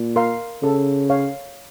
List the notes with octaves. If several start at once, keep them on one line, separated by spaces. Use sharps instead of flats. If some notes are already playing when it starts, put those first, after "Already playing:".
Already playing: A#2
A#4 F5 C6
C#3 A4
C#5 F5